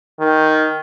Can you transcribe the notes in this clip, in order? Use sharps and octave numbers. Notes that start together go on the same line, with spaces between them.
D#3